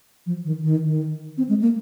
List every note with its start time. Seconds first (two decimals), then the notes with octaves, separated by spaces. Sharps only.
0.26 F3
0.45 D#3
0.63 D#3
0.86 D#3
1.38 C4
1.49 G#3
1.61 A#3